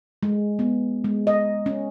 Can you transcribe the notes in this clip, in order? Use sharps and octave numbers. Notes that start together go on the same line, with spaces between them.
G#3
B3
G#3
D#5
C#4